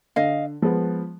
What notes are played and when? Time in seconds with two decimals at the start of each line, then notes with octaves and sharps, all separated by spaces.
0.16 D3 D#5 F5
0.62 F3 G#3 B3